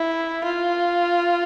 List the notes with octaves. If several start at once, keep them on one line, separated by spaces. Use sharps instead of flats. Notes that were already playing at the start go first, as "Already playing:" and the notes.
Already playing: E4
F4